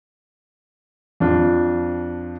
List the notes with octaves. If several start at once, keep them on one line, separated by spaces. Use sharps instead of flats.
F2 D4 F4